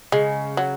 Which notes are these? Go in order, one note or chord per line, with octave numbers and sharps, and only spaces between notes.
C#3 G#3
F#3